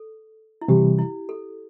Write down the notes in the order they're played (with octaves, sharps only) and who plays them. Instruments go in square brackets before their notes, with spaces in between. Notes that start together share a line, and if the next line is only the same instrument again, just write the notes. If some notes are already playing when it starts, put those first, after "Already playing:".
Already playing: [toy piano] A4
E4
[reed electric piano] C3 E3 G3 [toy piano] G4
[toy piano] E4
A4